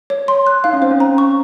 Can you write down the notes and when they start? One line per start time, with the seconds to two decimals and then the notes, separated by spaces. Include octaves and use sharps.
0.10 C#5
0.28 C6
0.47 F#6
0.64 D#4 F5
0.73 C#4
0.82 C4 C5
0.91 C#4
1.00 A#5
1.18 C#6